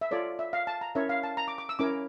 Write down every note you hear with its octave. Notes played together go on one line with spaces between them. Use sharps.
E5
F4 A4 C#5 D5
E5
F5
A5
A#5
C#4 E4 A#4 C#5 E5
F5
A5
A#5
D6
D6
E6
C#4 E4 A#4 C#5 D6